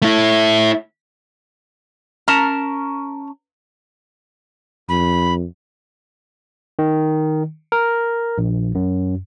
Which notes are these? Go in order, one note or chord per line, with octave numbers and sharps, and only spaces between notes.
A3 E4
C#4 A#4 A5 A#5
F2 B5
D#3
A#4
A#1
F#2